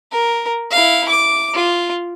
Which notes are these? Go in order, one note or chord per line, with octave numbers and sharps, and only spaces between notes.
A#4
E4 F5
D6
F4